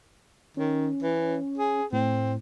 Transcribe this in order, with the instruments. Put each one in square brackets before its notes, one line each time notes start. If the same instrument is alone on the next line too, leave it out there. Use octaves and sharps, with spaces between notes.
[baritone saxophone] D#3 [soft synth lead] C#4
[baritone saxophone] E3
G#4
[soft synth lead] A2 [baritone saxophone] C4